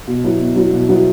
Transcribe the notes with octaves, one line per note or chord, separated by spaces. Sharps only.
B2
F#3 B3 E4
B2
F#3 B3 E4
B2
F#3 B3 E4